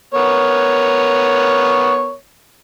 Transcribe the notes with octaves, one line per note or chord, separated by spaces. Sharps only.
B3 A#4 C#5